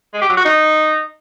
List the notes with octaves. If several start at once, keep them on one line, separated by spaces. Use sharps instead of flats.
G#3
G4
F#3
F#4
D#4